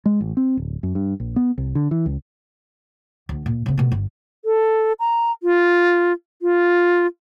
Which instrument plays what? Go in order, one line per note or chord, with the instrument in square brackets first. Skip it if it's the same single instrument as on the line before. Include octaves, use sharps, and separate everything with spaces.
[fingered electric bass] G#3
A1
C4
D1
F#2
G2
A#1
B3
C2
D3
E3
C#2
[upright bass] D2
A#2
C#3 C4
B2 A3
G1
[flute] A4
A#5
F4
F4